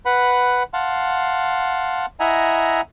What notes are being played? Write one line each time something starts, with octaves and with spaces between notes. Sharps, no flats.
B4 F#5 B5
F5 F#5 A5 C6
E4 D#5 E5 F#5 G#5 A#5